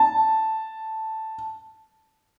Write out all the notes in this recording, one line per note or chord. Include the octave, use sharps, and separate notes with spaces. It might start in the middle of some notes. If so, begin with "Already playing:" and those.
Already playing: A5